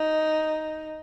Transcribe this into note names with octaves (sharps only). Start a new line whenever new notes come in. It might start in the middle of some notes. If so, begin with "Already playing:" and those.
Already playing: D#4